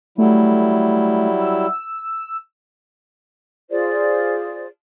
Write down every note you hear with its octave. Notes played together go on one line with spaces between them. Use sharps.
F#3 G3 A3 E4
E6
F4 G#4 C5 D5